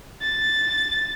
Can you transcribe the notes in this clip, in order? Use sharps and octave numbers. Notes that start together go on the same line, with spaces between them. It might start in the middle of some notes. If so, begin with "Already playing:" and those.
A6